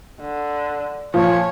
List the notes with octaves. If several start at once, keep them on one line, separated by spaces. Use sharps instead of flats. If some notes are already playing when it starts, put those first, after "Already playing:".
D3
A#2 F3 C#5